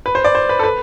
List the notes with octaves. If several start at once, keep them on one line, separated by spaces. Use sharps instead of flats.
B4
C5
D5
C5
B4
A4
B4